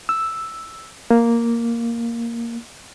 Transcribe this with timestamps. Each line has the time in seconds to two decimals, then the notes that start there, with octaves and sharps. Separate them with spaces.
0.09 E6
1.11 A#3